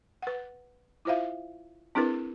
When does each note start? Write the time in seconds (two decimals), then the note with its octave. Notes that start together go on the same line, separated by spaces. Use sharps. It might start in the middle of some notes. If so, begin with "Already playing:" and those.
0.22 B4 F#5
1.05 E4 F4 C5 E5 F5
1.95 C4 D4 E4 G#4 A#4 B4